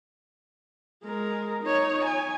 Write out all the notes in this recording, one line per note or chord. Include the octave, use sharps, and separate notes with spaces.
G#3 A#4
D#4 C#5
G#5